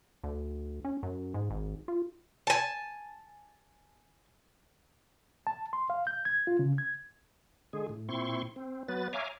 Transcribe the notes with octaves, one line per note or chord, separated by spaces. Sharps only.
D2
C#4
F#2
G#2
G#1
F4
G#5 A5
A5
C6
F5
G6
G#6
F4
C#3
G#6
D3 G#3 G#4
A2
A#2 C4 E4 C6 C#6
C4
F#3 B3 B4 A6
C#5 E5 F5 G#5 A#5 D6